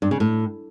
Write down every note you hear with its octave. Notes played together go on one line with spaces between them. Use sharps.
G2
C#3
A2